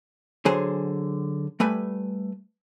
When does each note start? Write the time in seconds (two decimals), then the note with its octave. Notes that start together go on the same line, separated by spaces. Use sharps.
0.45 D3 F#3 G#4 C5 G#5
1.60 G3 A3 B4 G#5